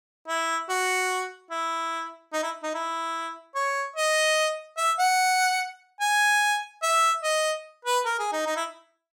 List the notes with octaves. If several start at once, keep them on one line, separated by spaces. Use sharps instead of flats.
E4
F#4
E4
D#4
E4
D#4
E4
C#5
D#5
E5
F#5
G#5
E5
D#5
B4
A#4
G#4
D#4
D#4
E4